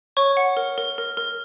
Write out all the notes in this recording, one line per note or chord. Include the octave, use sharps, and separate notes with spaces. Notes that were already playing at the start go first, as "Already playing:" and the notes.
C#5 C#6
F#5
A#4
A#4
A#4
A#4